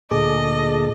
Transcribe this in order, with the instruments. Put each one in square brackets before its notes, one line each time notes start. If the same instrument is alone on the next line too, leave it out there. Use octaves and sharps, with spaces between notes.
[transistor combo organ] D2 A4 [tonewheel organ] A#2 [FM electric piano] G#4 D6 [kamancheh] D#5